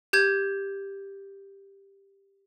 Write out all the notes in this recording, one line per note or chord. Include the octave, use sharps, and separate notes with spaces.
G4 G6 G#6